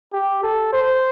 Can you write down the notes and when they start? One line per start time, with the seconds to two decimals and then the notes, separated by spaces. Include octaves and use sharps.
0.13 G4
0.43 A4
0.73 C5